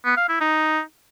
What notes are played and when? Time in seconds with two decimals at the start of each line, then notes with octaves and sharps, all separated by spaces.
0.05 B3
0.17 F5
0.29 E4
0.41 D#4